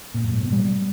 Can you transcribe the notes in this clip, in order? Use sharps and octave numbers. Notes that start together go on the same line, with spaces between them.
A#2
F#2
A2
B2
G3